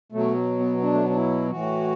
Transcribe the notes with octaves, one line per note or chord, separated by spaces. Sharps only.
B2 F#3 A3
B3
B3
D4
A3
B3
D4
E4
A2 E3 F#4